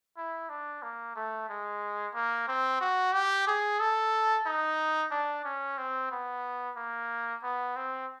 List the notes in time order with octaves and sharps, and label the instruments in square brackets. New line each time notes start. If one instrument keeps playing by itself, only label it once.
[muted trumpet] E4
D4
A#3
A3
G#3
A#3
C4
F#4
G4
G#4
A4
D#4
D4
C#4
C4
B3
A#3
B3
C4